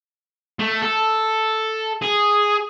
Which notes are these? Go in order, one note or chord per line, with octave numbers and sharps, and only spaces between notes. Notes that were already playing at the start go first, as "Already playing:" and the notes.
A3
A4
G#4